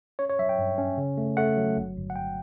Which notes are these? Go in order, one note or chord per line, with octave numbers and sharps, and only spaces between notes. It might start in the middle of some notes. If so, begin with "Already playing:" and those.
C#4 C#5
C#5
F#3 E5
G5
G2
C#4
C#3
A3
A3 F#5
F#3
G1
G1
F#5
G1 G5